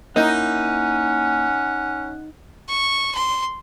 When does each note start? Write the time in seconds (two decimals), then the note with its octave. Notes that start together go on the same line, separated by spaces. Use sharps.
0.16 A#3 C#4 D#4 E4 F#5
2.69 C#6
3.15 C6